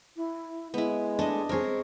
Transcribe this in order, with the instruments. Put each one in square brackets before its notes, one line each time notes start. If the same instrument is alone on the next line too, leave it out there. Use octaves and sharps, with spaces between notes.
[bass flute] E4
[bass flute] G#3 [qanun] B3 E4
[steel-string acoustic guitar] A3 [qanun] D4 D#5
[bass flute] G#3 [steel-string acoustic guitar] C4 G#4 [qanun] A#4 C#5